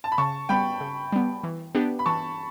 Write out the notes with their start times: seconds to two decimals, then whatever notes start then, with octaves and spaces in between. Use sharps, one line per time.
0.04 A5
0.12 B5
0.18 C#3 A5 C#6
0.49 G3 B3 G5 B5
0.80 C#3
1.12 G3 B3
1.44 E3
1.75 B3 D4 G4
1.99 B5
2.06 E3 A5 C#6